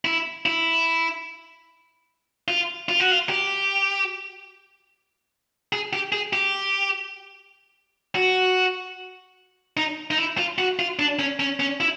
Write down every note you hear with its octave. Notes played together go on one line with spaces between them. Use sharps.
E4
E4
F4
F4
F#4
F4
G4
G#4
G4
G#4
G4
F#4
D#4
D#4
E4
F4
F#4
F4
D4
C#4
C#4
C#4
E4